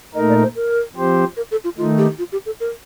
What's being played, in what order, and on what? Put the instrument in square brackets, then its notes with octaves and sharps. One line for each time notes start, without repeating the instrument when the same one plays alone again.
[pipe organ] A#2 A3 D#4 A#4 [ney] D#5
[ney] D5
C5
A#4
[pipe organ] F3 C4 G4 C5
[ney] A#4
A4
F4
[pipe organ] D#3 A3 D#4 [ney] F4
[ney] G4
F4
G4
A4
A#4